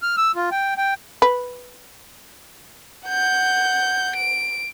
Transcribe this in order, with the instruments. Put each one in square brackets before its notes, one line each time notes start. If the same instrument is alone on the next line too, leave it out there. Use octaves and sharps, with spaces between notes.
[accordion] F6
E6
F4
G5
G5
[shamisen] B4
[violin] F#5 G6
D7